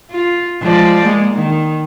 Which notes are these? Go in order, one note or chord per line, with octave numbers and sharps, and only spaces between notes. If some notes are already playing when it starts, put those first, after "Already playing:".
F4
F3 G#3 D5
G#3 A#3
D#3